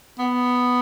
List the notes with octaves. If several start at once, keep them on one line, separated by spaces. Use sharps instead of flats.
B3